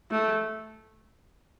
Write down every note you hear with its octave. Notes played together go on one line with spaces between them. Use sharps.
A3